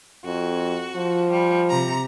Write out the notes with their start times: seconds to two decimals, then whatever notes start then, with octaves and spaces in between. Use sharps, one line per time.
0.25 F2 F#4
0.96 F3
1.30 G3
1.70 C3 A#5